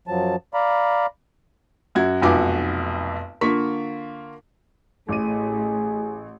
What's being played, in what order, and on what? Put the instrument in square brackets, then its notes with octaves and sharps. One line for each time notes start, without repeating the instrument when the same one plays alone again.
[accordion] F#2 F3 F#3 A5
D5 F5 A#5 B5
[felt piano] F#2 F#4 G#6
F1 B1 F2 F#4 G#5 D6
D3 A#3 F4 C#6 B6
[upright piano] A1 D6 D#7 [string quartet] A2 [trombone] G#4